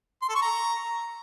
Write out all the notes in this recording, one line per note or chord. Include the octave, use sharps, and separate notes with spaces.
C6
A4
C#6
A#5